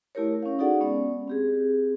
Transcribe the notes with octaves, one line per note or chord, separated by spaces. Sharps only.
A3 E4 G4 A#4 C#5
C#4 F5
D#4 F#4 G#4 A4 D5 F#5
G#3 B3 C#4 D5
C4 G4 G#4